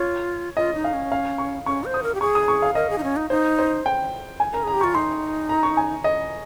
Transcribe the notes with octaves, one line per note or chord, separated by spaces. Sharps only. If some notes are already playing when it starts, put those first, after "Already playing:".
Already playing: F4 C#5
F4 D#5
D#4
F5
C#4
F5
C#6
C#4 C#6
C5
D#6
A#4
G4
G#4 C#6
D#6
C#6
F5
A#4 D#5
G#4
D#4
C#4
D#4
D#4 C5
C5
G5
G#5
A#4 A#5
G#4 A#5
G4
F4 C#6
D#4 C6
A#5
C#6
G#5
D#5